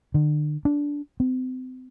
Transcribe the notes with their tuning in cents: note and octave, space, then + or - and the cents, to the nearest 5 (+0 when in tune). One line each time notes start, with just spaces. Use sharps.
D3 +40
D4 -15
C4 -35